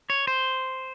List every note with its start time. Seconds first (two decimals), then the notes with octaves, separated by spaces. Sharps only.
0.10 C#5
0.27 C5